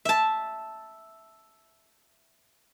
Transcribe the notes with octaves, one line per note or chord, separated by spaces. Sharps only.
E5 A5